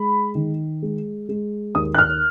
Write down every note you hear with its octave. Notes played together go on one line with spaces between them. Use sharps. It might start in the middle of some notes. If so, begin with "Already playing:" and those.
Already playing: G#3 B5
D#3
G#3
G#3
D#2 D#6
F#6
F6